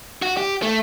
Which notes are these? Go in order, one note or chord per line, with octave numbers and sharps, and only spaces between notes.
F#4
G4
A3